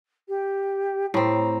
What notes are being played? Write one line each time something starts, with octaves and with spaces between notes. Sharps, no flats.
G4
A2 C4 A#5